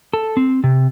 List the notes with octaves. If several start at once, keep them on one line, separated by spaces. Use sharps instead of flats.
A4
C4
C3